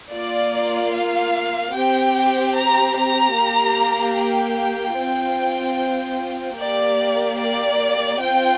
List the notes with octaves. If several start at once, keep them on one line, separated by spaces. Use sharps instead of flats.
A#3 F4 D5
F5
C4 G4 G5
A#5
A#5
A#3 G4
G5
C4 F4
A#3 G4 D5
D5
C4 F4 G5